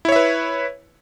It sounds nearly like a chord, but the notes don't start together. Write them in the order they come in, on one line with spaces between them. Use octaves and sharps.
E4 C#5 E5 B4